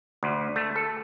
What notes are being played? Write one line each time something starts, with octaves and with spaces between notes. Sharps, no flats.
D2
A3
A4